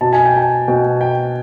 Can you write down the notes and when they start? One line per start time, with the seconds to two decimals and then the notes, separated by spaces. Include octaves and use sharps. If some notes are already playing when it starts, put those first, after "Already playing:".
0.01 B2 A5
0.13 G#5
0.26 G5
0.37 G#5
0.68 B2 G5
1.01 G5